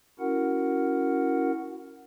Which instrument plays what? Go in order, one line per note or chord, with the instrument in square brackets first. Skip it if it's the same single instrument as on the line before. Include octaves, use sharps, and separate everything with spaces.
[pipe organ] C#4 E4 F#4 A#4 F#5